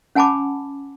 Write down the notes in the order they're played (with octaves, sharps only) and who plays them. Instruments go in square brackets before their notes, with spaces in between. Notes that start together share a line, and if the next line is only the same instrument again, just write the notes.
[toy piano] C#4 F#5 G#5 A5 B5 D6